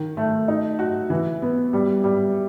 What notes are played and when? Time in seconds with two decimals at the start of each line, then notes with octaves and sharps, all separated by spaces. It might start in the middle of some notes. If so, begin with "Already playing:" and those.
Already playing: D#3
0.17 A3
0.48 D#4
0.79 F#4
1.10 E3
1.42 B3
1.73 G3
2.04 G3